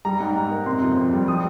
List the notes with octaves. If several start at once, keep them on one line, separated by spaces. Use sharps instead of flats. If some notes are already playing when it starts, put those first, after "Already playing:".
G3 A#5
G#2
G#2
A#3
C3 C6
F2
F2
G3
F3 D#6